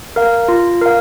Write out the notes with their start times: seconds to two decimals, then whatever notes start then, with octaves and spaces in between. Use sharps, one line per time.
0.16 A#4 F5
0.48 F4
0.81 A#4 F5